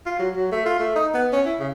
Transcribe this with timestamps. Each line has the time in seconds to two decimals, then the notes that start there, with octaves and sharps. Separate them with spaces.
0.06 F4
0.19 F#3
0.36 F#3
0.52 A3
0.66 F4
0.79 A3
0.96 D#4
1.14 B3
1.32 C#4
1.46 E4
1.59 C#3